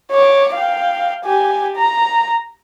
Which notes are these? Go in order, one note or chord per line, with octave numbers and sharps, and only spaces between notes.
C#5 D6
F5 G5
G4 G#5
A#5